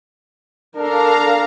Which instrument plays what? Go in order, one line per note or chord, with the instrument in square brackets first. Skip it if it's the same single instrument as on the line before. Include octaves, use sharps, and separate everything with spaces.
[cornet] D4 [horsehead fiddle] A4 A#4 [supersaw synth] F5 A#5